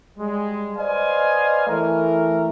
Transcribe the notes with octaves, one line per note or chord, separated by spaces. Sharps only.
G3 G#3
B4 C5 D5 D#5 F5 G#5
E3 A3 A#4